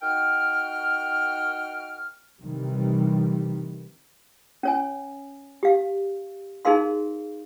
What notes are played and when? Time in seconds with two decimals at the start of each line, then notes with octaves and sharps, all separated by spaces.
0.02 D#3 F#4 G5 F6
2.41 C3 D#3 E3 G3
4.63 C#4 C#5 G#5
5.63 G4 F5
6.65 D#4 G#4 A#4 F5 C6